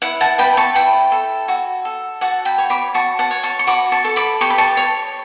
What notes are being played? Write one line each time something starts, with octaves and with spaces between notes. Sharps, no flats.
E4 F#5
F#5 A5
B4 G5 B5
A5 C#6
E4 G5 B5
A4
F#4
A4
F#4 F#5 A5
G5 B5
C#5
B5 D6
F#4 A5 C#6
F#5 A5
C#5
A5 C#6
C#6
F#4 B5 D6
A5 C#6
A4
B5 D6
G4 C#6
B5
A5 C#6
C#5